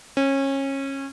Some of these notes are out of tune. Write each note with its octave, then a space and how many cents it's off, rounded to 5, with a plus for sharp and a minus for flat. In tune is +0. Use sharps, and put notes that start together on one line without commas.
C#4 -25